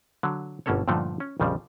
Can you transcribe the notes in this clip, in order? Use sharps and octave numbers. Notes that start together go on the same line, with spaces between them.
D3 F#3
G1 B2 A#3 C#4 A4 C#5
G2 A#2 D3 F3 A3 D#4
C#4
A#1 F2 C#3 F3 G3